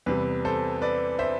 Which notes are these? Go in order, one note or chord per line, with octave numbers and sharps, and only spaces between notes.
E2 C3 G3 B4
A4 C5
B4 D5
C5 E5